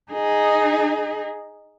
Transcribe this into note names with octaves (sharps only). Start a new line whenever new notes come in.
D#4 G#4